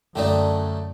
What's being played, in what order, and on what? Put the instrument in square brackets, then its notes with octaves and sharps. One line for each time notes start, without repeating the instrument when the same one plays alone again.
[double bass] F#2 [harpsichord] D3 A3 D#4 [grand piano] D5 G5